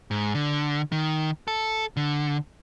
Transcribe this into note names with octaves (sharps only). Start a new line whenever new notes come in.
G#2
D3
D#3
A4
D3